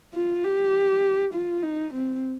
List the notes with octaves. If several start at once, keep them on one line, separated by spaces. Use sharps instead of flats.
F4
G4
F4
D#4
C4